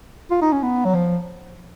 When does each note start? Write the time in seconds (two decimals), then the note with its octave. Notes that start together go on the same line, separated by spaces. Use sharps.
0.31 F4
0.42 D#4
0.52 C#4
0.63 B3
0.85 F#3
0.94 F3